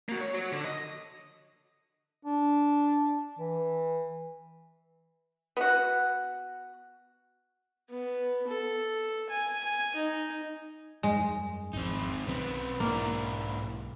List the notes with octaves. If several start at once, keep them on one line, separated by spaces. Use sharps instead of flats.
A#3 F#4
C#5
F#4 C#5
D3
D#5
D4
E3
B3 F#4
B3
A4
G#5
G#5
D#4
F#2 G3 G#3
G#1 F2 F3 C4 D#4
B1 D#3 F#3 B3 C4
G#2 A#3 D4 E4